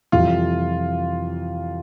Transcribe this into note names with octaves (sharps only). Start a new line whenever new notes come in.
F2 C3 E3 G3 F4